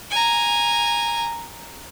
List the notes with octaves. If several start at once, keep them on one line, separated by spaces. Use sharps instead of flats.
G#5 A#5